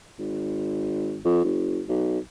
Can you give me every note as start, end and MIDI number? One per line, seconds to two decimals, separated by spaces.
0.19 1.20 32
1.25 1.43 41
1.44 1.81 30
1.88 2.18 35